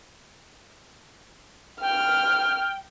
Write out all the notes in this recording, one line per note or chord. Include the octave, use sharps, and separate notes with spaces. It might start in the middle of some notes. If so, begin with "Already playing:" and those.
G5 F6